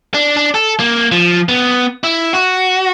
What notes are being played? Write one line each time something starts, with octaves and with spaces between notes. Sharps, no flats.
D4
D4
A4
A#3
F3
B3
E4
F#4